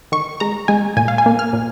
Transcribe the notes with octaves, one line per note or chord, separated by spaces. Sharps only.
D#3 C#6
G#3 A#5
G#3 G#5
A#2 G#5
F5
G#5
A#3
F6
A#2